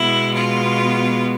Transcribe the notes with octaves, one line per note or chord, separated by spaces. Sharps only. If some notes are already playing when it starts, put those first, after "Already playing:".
Already playing: B2 G#3 B3 E4
F4